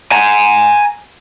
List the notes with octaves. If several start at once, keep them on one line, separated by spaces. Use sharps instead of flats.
G#5 A#5